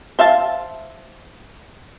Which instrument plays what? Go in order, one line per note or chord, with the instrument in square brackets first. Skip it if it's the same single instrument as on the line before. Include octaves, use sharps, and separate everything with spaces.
[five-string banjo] C5 E5 F5 A5